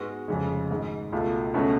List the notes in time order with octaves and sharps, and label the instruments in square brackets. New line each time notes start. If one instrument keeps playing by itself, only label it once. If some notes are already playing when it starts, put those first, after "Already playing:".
Already playing: [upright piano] G#2 G#3 B3 F#4
F1 F2 C#3 G#3 C#4
G#1 G#2 G#3
C#2 B2 A3 F4
C#2 B2 A3 C#4 F#4